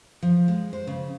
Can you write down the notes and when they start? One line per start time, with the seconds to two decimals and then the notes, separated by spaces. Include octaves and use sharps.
0.22 F3
0.48 G#3
0.73 C5
0.87 C#3